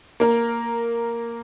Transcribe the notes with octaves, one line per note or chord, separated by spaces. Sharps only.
A#3 A#4